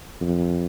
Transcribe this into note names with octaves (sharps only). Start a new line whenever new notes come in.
F2